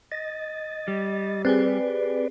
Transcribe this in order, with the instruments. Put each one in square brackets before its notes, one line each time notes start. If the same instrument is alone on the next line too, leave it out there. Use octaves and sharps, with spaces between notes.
[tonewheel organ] D#5 A6
[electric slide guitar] G3
[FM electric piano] C4 G4 G#4 [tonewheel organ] B4 D5